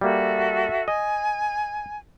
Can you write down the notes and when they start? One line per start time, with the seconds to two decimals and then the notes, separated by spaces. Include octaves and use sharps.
0.01 G3 A#3 F#4 A4 E5
0.88 D#5 G#5